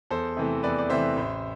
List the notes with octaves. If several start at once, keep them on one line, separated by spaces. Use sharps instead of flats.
E2 A4 C5
C3 E3 A3
E2 B4 D5
D5
C3 E3 A3 C5 E5
A1